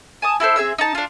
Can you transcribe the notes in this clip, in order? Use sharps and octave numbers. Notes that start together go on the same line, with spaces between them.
G#5 A5 D#6
E4 F#4 A4 C5
C4 G#4 E5 E6
D#4 A5
D4 F4